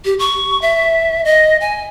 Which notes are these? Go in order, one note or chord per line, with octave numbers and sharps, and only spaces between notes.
G4
C#6
E5
D#5
G#5